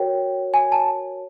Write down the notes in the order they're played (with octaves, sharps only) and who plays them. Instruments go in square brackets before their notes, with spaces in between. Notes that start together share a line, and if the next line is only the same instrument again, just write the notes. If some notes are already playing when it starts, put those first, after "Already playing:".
Already playing: [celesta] F#4 A#4 C#5 G5
G#5
A5